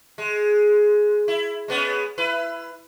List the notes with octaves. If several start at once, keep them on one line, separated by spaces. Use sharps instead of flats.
G#3
E4
G#3 B3 C#4
E4 B4